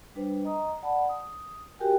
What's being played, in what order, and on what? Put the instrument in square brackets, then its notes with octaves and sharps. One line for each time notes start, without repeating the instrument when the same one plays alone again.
[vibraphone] G3 D4 B4 C5
D#5 A#5 D#6
D5 F#5 A5 B5
D#6
F#4 G4 A#4 G5 G#5